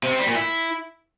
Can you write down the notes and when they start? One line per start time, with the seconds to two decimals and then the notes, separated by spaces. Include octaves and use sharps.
0.03 C3
0.11 C4
0.19 G3
0.27 A#2
0.36 E4